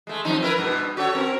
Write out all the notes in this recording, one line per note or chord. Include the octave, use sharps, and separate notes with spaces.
G#3 A3
F2 F3 D#4
E4 A#4 B4
G2 B2
F#4 A4 C#5
C4 A#4